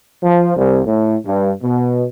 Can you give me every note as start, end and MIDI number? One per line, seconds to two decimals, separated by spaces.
0.22 0.53 53
0.57 0.81 36
0.86 1.16 45
1.25 1.50 43
1.62 2.05 47